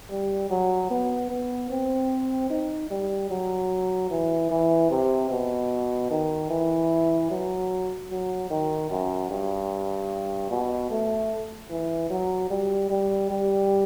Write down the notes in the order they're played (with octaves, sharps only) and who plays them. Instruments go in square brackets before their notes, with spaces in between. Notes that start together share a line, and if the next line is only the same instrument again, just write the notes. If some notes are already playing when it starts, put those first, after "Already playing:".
[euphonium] G3
F#3
B3
B3
C4
D#4
G3
F#3
E3
E3
C3
B2
D#3
E3
F#3
F#3
D#3
F#2
G2
B2
A3
E3
F#3
G3
G3
G3